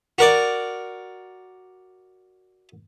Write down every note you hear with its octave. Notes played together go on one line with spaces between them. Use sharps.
F#4 A#4 D5